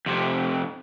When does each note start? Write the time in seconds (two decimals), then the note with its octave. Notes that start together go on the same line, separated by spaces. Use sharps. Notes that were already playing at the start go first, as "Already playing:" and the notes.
0.06 F2 C3